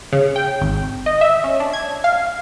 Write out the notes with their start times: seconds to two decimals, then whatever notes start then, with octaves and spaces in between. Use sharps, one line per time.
0.12 C#3
0.36 G5
0.61 G#1
1.06 D#5
1.21 E5
1.44 C#4
1.60 D4
1.73 G#6
2.04 F5